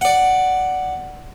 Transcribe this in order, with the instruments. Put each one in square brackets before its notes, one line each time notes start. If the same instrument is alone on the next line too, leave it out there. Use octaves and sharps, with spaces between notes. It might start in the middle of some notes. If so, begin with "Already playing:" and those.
[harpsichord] D5 F#5